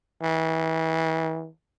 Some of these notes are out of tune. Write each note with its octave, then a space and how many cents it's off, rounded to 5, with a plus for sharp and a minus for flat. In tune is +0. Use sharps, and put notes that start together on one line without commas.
E3 -35